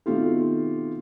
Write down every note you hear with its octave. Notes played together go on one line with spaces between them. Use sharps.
B2 D#3 A3 C4 F4 G4